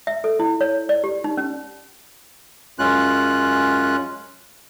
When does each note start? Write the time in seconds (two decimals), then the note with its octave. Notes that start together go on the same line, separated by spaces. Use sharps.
0.07 E5
0.24 A4
0.39 E4
0.61 C#5
0.89 D5
1.04 G4
1.24 D#4
1.37 C#4
2.79 F#2 G#3 C#4 F4 F#6